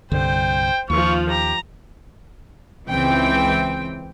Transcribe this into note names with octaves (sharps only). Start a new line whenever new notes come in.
C2 G2 D3 C5 G5
D#2 F3 F4 C#6
G4 A#5
C#2 E3 C4 G5